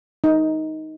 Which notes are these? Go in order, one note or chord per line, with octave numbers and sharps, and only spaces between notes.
D#4